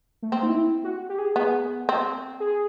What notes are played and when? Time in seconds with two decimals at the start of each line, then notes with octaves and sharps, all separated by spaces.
0.22 A3
0.32 A#3 C4
0.43 D#4
0.49 E4
0.84 F#4
1.09 G4
1.18 G#4
1.36 B3
1.89 C4
2.40 G#4